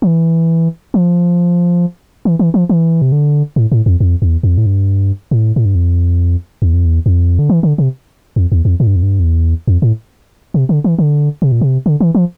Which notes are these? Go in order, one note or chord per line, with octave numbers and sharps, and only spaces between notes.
F3
E3
F3
E3
E3
F3
E3
C3
D3
A2
A2
F2
F2
E2
F2
A2
G2
A2
A2
G2
F2
E2
F2
E2
F2
D3
E3
D3
C3
F2
E2
F2
A2
G2
F2
G2
F2
E2
F2
A2
C3
D3
E3
D3
C3
A#2
C3
D3
E3
F3